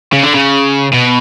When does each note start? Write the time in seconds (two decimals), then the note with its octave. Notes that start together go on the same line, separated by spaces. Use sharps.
0.13 C#3
0.24 D3
0.34 C#3
0.94 B2